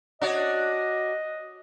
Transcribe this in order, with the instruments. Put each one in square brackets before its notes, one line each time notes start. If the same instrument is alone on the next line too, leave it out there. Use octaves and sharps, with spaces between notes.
[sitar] D4 F#4 C#5 [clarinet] D#5